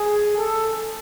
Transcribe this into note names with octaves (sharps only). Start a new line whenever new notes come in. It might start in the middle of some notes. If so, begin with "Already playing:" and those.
Already playing: G#4
A4